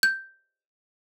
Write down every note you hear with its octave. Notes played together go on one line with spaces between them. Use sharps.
G6